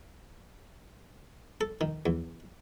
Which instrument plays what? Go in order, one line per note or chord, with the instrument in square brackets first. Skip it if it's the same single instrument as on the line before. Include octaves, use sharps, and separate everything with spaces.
[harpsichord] A4
D#3
E2